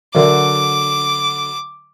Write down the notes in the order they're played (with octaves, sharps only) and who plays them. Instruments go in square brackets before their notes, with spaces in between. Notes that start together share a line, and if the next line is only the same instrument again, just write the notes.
[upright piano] D3 F#3 [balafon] A#4 D5 E5 [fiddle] D6